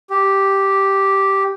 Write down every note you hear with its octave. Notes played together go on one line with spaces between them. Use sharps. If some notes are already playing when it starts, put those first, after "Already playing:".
G4